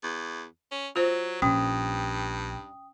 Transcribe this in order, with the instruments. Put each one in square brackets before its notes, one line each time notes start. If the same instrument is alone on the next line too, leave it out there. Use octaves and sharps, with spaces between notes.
[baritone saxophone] E2
C#4
[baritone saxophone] F#3 [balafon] F4 C5
[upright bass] A#1 [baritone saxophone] G2 [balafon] C#4 [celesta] G5 D#6